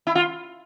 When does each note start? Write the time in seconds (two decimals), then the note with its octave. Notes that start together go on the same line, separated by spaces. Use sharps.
0.07 E4
0.15 F4